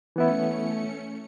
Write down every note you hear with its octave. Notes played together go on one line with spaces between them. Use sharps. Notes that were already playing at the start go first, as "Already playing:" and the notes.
E3 A3 B3 C#4 E4 C#7